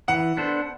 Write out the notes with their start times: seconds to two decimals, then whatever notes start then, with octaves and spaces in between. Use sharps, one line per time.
0.08 E3 F#5
0.37 B3 D4 A4 C5